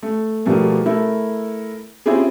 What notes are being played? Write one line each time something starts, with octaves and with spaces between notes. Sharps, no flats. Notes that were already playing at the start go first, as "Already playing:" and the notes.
A3
B2 F3 G3 A3 A#3
A3 E4 A#4
C4 C#4 E4 F4 G4 G#4